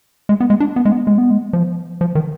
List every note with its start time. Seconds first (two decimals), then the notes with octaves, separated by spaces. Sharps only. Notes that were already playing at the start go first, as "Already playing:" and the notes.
0.29 G#3
0.40 B3
0.50 G#3
0.60 D4
0.76 B3
0.85 G#3
0.92 B3
1.07 G#3
1.18 B3
1.31 G#3
1.53 F3
2.01 F3
2.15 D#3